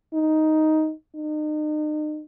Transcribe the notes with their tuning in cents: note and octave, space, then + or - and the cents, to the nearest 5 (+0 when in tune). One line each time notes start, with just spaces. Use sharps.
D#4 +5
D#4 -35